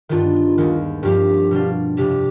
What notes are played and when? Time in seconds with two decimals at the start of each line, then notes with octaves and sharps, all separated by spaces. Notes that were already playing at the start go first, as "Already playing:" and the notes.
0.09 G2 D#3 B3 D4 F4
0.58 D#2 D#3 G#3 B3
1.03 G2 F3 C4 F4 G4
1.51 B2 G3 D4 F4
1.97 F2 C3 G3 G4